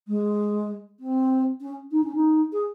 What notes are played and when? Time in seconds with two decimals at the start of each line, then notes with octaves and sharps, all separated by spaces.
0.08 G#3
1.00 C4
1.61 C#4
1.92 D#4
2.04 C#4
2.15 D#4
2.52 G#4